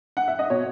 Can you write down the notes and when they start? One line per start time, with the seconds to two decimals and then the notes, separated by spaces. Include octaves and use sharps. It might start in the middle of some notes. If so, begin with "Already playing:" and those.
0.17 F#5
0.28 E5
0.39 D#5
0.50 B2 C#5